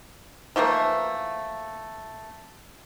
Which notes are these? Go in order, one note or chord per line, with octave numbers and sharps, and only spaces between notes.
E3 F3 A3 A#3